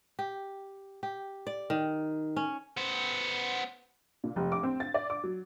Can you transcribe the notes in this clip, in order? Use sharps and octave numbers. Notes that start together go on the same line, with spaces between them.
G4
G4
D5
D#3
C#4
B3 C5
A#2
F1
D6
C4
A6
D5
D6
F#3